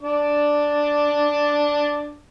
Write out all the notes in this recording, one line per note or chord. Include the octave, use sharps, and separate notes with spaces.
D4 D6